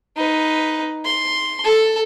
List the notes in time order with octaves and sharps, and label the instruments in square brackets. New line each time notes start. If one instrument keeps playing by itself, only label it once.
[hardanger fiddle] D#4 B4
C6
A4